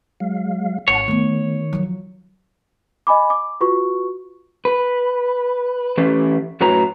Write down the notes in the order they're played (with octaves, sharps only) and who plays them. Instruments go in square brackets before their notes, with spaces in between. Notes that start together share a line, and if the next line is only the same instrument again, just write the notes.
[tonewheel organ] F#3 G#3 F5
[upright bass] G#1 [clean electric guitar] C#5 [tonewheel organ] F#5 A5
[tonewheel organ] D#3 [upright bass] A3 B3
[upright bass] F3 F#3
[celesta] D#5 G#5 B5 D6
D6
F4 F#4 B4 C#6
[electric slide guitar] B4
E3 A3 C#4 G4 B4
F#2 A2 F#4 B4 C#5 A#5